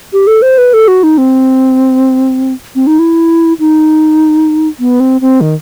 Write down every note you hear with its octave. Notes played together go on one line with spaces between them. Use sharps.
G4
A4
C5
B4
A4
F#4
D#4
C4
C4
D#4
E4
D#4
B3
C4
C4
D#3